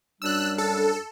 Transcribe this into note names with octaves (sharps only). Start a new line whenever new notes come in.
F#2 G3 D4 E6 F#6
A4